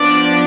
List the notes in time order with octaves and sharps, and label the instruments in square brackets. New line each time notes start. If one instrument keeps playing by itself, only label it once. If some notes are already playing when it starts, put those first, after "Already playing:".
Already playing: [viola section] F3 B3 D4 D5